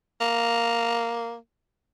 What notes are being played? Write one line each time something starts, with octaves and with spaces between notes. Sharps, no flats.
A#3